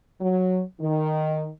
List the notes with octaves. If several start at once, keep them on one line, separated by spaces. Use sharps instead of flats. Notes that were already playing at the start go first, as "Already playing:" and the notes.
F#3
D#3